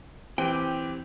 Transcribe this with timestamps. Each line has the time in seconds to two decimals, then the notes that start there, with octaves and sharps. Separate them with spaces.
0.38 E3 C4 G4 G5 D#7